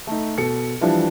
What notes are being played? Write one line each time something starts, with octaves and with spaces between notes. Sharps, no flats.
A3 D#4
B2 A4 C#7
E3 F3 G3 D4 E4